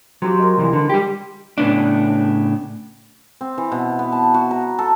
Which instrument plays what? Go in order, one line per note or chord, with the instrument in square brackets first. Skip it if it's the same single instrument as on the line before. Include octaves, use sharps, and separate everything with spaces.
[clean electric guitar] F#3 [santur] C4 F4 G4
[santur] G#3 A#4
[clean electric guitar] C2 E3
[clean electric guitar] D3 [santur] B4 D5 F#5
[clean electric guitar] G3 G4
[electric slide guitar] A2 C#3 B3 D4
[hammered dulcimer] C4
E3
B2
B3
A5
F#4
A#5
A4